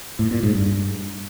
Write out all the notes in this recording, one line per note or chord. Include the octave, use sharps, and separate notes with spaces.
A2
A#2
G#2
G2